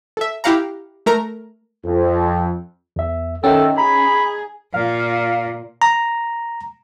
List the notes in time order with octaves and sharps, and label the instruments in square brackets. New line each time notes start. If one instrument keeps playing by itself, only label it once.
[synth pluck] A4 E5
E4 G4 F5 F#5 A#5
A3 A#4 A#5
[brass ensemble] F2
[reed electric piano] E2 E5
[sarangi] D#3 [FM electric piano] C#4 [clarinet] A4 [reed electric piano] E5 F#5 G5
[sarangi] G#4 [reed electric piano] A#5 [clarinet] B5
[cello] A#2 [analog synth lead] F5
[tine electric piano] A#5